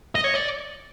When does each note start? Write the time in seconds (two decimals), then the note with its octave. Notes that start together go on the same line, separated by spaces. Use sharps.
0.15 D#5
0.24 C#5
0.34 D5